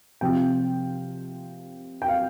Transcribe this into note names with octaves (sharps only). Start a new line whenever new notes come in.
C3 F3 C4 F4 G5
G5
F5